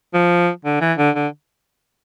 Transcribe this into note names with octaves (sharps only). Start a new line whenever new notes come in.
F3
D3
E3
D3
D3